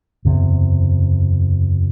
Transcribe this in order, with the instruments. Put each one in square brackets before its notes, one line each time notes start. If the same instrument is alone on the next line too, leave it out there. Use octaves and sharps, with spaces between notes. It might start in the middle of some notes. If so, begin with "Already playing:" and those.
[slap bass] F#1 E2 C3